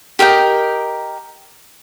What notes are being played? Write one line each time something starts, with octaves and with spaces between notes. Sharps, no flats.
G4 A#4 D#5 G5